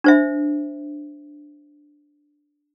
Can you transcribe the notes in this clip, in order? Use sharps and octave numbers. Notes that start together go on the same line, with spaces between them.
D4 C5 E5